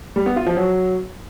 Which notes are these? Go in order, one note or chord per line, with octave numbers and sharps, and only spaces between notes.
G3
B3
F4
F3
F#3